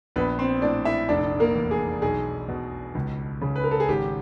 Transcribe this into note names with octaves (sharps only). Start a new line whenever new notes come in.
A#1 B3 B4
C4 C5
A2 D4 D5
E4 E5
F1 D4 D5
A#3 A#4
E2
G#4
B1 G#4
B2
C#2
C#3
B4
A#4
A4
G#4
G#1 G4